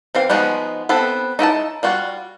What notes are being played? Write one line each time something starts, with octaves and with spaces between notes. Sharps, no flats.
E3 C4 F5
F3 G#3 B3 D#4 F#4
B3 C4 A4 B4
D#4 E4 G5 A5
G3 F4 F#4